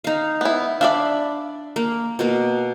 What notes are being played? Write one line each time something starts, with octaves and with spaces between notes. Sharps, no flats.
D#4 F5
B3 E4
D4 D5 E5 F5 B5
A#3
B2 A#3